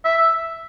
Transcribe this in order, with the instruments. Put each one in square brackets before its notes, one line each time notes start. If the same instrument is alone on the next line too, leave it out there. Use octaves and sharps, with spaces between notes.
[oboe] E5